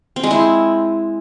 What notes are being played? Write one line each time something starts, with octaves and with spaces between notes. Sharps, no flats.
C4
G#3
E4